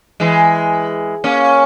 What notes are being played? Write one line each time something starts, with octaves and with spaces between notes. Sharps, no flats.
E3 G#3
A#3 C#4